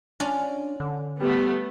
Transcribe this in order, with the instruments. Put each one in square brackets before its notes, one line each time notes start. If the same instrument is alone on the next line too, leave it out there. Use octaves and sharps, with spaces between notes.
[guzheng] C#4 F4 D5 [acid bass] D4
[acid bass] D3
[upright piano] G3 [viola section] A3 B3